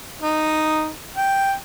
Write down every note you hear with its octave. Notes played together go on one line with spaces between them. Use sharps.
D#4
G5